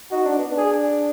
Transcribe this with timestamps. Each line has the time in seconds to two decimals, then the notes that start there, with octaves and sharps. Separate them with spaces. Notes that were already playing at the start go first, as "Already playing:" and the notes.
0.11 D#4 F#4
0.25 D4
0.38 B3
0.52 D4
0.57 G#4